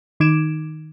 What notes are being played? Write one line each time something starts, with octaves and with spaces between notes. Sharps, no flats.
D#3 D#4 D6 G#6 D7 E7